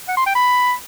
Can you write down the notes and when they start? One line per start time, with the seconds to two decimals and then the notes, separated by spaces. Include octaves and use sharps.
0.08 F#5
0.17 C6
0.26 G5
0.35 B5